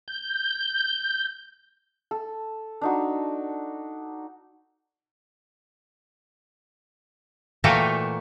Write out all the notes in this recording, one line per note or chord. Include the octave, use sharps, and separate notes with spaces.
G6
A4
D4 D#4 F#4
A#2 E3 A3 F#4 F5 G5